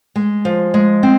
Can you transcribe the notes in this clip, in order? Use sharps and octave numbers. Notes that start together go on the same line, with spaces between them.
G#3
F3
G#3
C4